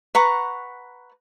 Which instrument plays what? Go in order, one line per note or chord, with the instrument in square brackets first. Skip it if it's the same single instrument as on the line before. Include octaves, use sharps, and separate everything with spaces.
[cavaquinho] B4 F#5 A#5 C#6